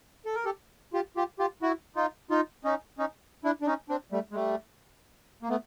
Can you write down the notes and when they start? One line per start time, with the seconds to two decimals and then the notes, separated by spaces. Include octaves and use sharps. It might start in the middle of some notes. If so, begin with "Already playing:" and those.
0.25 A4
0.35 A#4
0.45 G4 A4
0.93 F4 G4
1.17 F4 G4
1.39 F4 G4
1.62 E4 F#4
1.96 D#4 F4
2.30 D#4 F4
2.64 C#4 D#4
2.98 C#4 D#4
3.44 D4 E4
3.62 D4
3.67 C#4 D#4
3.89 C4 D4
4.12 G3 A3
4.31 G#3
4.35 G3 A3
5.43 A#3
5.49 A3 B3